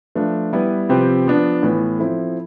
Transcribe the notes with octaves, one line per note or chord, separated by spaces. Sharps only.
F3 A3 D4 F4 B4
G3 B3 E4 B4
C3 F3 C4 G4 B4
F3 B3 D4
A2 E3 B3
F3 C4 E4 A4